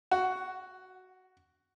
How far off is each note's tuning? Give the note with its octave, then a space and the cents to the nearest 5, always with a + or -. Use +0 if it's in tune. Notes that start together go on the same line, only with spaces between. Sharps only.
F#4 +5